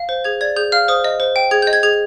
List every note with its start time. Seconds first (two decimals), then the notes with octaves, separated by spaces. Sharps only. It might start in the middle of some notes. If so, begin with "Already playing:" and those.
Already playing: F5
0.09 C5
0.24 G#4 G#6
0.41 D5 G#6
0.56 G#4 G6
0.72 F5 F6
0.88 C5 D#6
1.04 D#5
1.20 C5
1.36 G5
1.51 G#4 G#6
1.62 D#5 G6
1.73 G#6
1.83 G#4 G#6